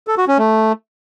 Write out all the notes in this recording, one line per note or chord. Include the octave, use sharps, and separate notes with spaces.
A4
F#4
C#4
A3